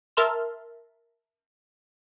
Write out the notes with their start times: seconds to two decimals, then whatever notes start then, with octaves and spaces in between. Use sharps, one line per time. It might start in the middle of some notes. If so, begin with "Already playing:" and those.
0.17 A#4 E5 A5 C6 F6